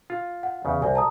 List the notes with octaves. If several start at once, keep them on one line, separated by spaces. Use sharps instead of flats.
F4
F#5
E2 C#3
C2 C5 D5 G#5
A5 A#5 D#6